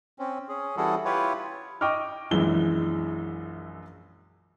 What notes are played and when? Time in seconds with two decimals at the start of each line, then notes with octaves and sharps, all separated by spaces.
0.19 C4 C#4
0.49 C#4 G#4
0.77 E3 G3 E4 F#4 G#4 A4
1.05 E4 F4 G4 B4 C#5
1.81 D#5 G5 C#6 D6 F6
2.31 A#1 F#2 E3 G#3 G7